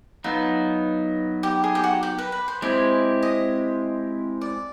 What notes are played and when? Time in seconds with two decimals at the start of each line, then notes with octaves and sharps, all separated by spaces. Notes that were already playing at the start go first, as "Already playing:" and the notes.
0.24 F#3 B3 D#4 F4
1.43 G4
1.64 G#4
1.75 G4
1.84 F#4
2.03 G4
2.18 B4
2.32 B4
2.48 C5
2.62 G#3 C4 E4 G4 C5
3.23 D#5
4.41 D5